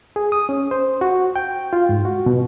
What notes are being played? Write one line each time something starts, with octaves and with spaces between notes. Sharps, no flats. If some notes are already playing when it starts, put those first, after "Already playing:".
G#4
D#6
C#4
C5
F#4
G5
F4
G#2
F#4
B2